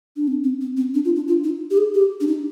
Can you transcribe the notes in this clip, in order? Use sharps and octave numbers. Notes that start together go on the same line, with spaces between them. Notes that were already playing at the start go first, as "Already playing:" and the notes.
D4
C4
C4
C4
C4
D4
F4
D4
F4
D#4
G4
G#4
G4
D4
D#4